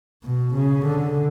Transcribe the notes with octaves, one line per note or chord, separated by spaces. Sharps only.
B2
C#3
D3